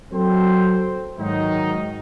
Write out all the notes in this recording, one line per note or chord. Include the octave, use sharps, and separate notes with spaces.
F#3 C4 A4 C5
G#2 D#3 F#3 D#4